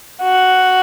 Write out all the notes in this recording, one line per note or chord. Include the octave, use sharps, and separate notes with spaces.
F#4